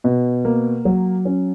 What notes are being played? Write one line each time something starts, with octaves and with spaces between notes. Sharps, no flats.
B2
A#3
F#3
C#4